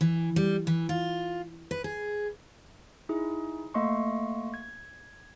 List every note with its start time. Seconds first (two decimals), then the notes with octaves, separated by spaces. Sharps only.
0.01 E3
0.36 G3
0.67 E3
0.89 F4
1.71 B4
1.84 G#4
3.09 D#4 E4 G#4
3.74 A3 A#3 D#5 C6 C#6
4.54 G#6